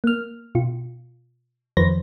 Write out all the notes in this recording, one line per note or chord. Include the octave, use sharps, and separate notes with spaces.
A#3 F6
B2 F4
F2 D#3 F3 B4 C5 A#6